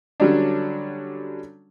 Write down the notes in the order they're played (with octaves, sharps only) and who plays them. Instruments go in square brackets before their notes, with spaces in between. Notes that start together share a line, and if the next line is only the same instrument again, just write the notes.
[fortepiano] D3 F#3 G3 C#4 D4